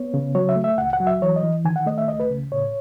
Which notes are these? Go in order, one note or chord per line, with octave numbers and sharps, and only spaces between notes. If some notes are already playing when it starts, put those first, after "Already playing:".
Already playing: B3 C#5
C#3
F#3 C#5
E5
A3
E5
C#2 F#5
F#5
F#3
E5
E3 C#5
D#5
E3
D#3 G#5
F#5
A3 D#5
E5
C#2 D#5
B4
C#3
A2 C#5